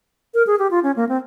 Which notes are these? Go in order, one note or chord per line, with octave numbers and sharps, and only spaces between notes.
A#4
G#4
G4
F4
C#4
A#3
C4